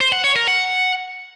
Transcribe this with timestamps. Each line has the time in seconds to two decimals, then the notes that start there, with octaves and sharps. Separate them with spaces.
0.01 C5
0.12 F#5
0.24 C#5
0.36 A#4
0.48 F#5